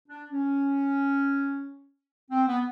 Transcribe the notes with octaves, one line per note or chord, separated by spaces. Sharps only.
D4
C#4
C4
B3